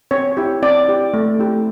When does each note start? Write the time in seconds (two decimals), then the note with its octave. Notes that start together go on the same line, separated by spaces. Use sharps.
0.11 C4 C#5
0.37 E4 G4
0.63 C4 D5
0.88 E4 G4
1.14 A3
1.39 C4 E4 G4